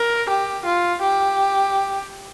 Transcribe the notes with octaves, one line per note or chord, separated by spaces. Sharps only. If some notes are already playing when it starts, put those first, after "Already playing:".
Already playing: A#4
G4
F4
G4